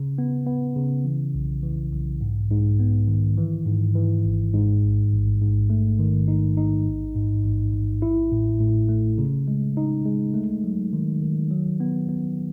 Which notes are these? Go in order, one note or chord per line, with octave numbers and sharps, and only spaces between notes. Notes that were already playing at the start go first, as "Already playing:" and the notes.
Already playing: C#3
B3
B3
C#3
E3
B1
E3
B1
G#2
G#2
B3
D#3
E3
G#2
E3
G#1
G#2
A1
A1
G#2
A3
D#3
D#4
D#4
A1
G#2
A1
A1
E4
A2
A2
A3
C#3
G#3
D#4
G#3
A3
F#3
D#3
D#3
F#3
B3
B3